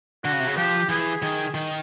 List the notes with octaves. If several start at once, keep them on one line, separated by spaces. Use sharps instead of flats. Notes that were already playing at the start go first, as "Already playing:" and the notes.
D3 F#4
C#3
C3
C#3
F3 G4
E3 G#4
D#3 G#4
D#3